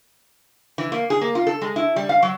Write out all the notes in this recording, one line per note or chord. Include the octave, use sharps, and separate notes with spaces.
E3
A#3
G#4
A#3
F4
A4
G#3
E4
G3
F5
F#3